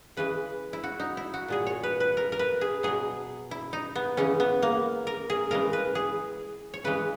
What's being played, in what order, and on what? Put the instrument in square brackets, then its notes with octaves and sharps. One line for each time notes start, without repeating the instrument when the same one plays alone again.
[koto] C#3 E3 G#3 B4
E4
F#4
D#4
E4
F#4
A#2 G#3 G#4
C#5
B4
B4
A#4
A#4
B4
G#4
B2 F#3 G#4
E4
D#4
B3
C#3 E3 G#3 C#4
B3
A#3
A#4
G#4
C#3 E3 G#3 A#4
B4
G#4
C#5
C#3 E3 G#3 B4